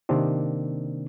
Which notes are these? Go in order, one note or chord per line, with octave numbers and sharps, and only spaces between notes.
C3 D#3 A#3 C4 D4